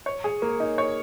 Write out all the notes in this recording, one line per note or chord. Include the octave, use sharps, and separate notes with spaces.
C#5
G#4
A#3
D#4
C#5